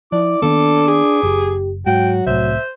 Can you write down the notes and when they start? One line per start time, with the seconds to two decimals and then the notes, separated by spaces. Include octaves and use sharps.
0.12 F3 E4 D5 D6
0.42 D#3 A#3 B3 D4 A4
0.87 G#4
1.23 F#1 G4
1.86 G#2 F#3 F#4 G5
2.26 C2 A2 C5 E5